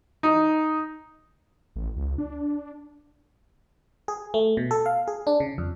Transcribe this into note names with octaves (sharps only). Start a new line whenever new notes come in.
D#4
A1
C#2
D4
G#4
A3
B2
A4
F5
G#4
D4
C#3
F2